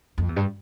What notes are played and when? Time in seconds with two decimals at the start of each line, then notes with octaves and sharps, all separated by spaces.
0.18 F2
0.29 E2
0.36 G2